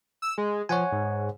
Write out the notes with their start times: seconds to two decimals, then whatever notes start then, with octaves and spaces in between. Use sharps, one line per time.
0.22 E6
0.38 G#3
0.69 F3 C#5 F#5 G#5
0.92 G#2